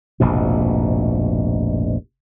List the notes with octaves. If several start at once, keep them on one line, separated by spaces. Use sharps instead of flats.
F1 A#1 G#2 B2